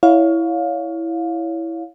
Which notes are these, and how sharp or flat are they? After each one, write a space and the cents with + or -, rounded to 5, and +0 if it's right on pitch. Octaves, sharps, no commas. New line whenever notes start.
E4 +0 C#5 +20 F5 +20